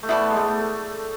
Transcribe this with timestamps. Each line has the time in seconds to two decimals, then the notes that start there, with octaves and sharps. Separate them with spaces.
0.03 A3
0.08 B3 E4 A4 D5 A5
0.30 G#3
0.36 A3